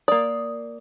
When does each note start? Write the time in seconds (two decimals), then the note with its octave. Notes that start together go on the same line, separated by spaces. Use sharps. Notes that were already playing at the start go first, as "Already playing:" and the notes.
0.08 A#3 D5 D#6